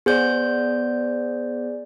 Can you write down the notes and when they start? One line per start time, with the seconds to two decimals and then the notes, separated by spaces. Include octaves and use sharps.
0.06 B3 G#4 C5 D5 G6